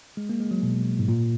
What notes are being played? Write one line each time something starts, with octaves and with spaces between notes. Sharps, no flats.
G#3
A#3
G#3
F#3
B2
G#2
A#2